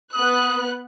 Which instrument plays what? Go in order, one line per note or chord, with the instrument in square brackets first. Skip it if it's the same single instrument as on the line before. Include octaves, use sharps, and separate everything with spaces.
[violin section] B3 F#6 [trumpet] D#6